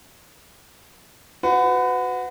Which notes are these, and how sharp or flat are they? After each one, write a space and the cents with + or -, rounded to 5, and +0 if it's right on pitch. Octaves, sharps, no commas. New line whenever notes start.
F#4 -10 B4 +30